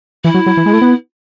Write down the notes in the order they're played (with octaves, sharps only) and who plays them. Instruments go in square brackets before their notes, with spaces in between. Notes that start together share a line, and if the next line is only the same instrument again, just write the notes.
[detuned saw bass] E3 [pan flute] E4
[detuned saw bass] F#3
F#3
E3
G#3
A3
B3